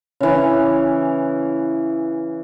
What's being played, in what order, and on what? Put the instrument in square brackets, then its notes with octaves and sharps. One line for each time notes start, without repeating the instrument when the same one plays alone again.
[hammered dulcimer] C#3 E3